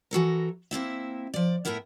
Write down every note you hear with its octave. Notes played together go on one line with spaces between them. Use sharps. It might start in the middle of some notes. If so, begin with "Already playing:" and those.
E3 F#4 A4 A#4
A#3 C4 E4 E5
F3 D5
A2 B3 E4 A#4 E5